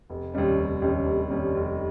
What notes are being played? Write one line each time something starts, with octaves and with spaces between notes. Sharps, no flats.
F1
D#2 C#3 G3 C#4
F1
D#2 C#3 G3 C#4
F1
D#2 C#3 G3 C#4
F1